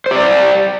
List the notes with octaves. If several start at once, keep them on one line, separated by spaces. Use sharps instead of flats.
G4 C5 D5